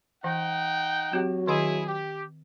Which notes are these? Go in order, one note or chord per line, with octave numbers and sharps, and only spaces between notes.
E3 D#4 F#5 G5
F#3 C4 G4
D#3 E4 G#4 D#5 F#5
G4